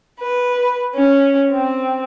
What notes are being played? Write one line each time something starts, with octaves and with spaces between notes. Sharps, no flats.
B4
C#4
C4